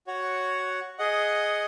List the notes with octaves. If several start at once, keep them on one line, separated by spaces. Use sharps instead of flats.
F#4 C#5 F#5
G#4 D#5 F#5